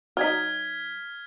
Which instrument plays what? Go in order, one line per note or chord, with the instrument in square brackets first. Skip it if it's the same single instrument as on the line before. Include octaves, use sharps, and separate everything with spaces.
[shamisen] F#3 D#4 [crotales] F6 G#6 B6